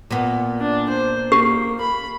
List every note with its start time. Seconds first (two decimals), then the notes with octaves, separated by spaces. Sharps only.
0.11 A#2 B3
0.60 D4
0.89 C5
1.32 A#3 G4
1.80 B5